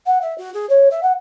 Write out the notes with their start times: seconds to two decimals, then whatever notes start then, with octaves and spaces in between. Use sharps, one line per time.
0.06 F#5
0.21 E5
0.37 F#4
0.53 G#4
0.69 C#5
0.90 E5
1.02 F#5